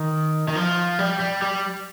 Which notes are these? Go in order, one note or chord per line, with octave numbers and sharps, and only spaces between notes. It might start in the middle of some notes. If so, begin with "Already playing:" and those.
Already playing: D#3
D#3
F3
G3
G3
G3